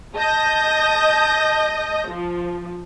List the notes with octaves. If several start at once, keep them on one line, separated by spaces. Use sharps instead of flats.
D#5 A5 D#6 G6 A#6
F3